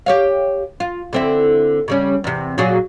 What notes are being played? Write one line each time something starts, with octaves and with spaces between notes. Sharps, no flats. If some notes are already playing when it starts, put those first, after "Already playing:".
G4 C#5 F5
F4
D3 C4 E4
C#3 G3 C#4
E2 C3
A#2 F#3 G#4